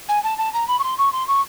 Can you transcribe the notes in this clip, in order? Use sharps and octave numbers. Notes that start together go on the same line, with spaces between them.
G#5
A5
A5
A#5
B5
C#6
C6
C#6
C6
C#6